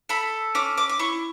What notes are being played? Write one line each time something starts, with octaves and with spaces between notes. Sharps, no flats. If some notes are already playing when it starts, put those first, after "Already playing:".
A4 B5
C#4 D6
D6
D6
E4 C#6